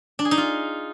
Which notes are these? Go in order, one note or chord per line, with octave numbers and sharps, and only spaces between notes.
D4
G#4
D#4
F4